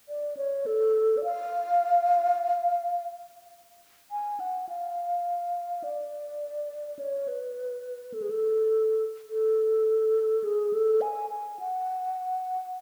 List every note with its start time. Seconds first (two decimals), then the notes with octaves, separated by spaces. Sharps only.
0.09 D5
0.37 C#5
0.66 A4
1.17 D5
1.24 F5
4.11 G#5
4.40 F#5
4.69 F5
5.84 D5
6.99 C#5
7.28 B4
8.14 A4
8.22 G#4
8.30 A4
9.29 A4
10.44 G#4
10.73 A4
11.01 G#5
11.30 G#5
11.60 F#5